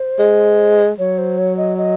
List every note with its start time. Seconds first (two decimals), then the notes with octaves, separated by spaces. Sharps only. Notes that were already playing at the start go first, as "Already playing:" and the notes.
Already playing: C5
0.19 G#3
0.99 F#3 C#5
1.18 C5
1.38 C#5
1.57 D#5
1.78 D#5